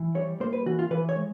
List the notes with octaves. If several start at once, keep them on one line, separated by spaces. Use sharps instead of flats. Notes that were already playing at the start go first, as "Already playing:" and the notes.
Already playing: E3
G3 C#5
A#3 C5
B4
E3 F#4
F4
E3 B4
C#5
G#3